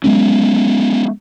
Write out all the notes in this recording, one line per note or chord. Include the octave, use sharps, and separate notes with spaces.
F#3 G#3 B3 C#4